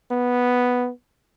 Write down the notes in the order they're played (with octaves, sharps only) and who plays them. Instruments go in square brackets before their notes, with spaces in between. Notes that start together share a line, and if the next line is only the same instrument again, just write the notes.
[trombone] B3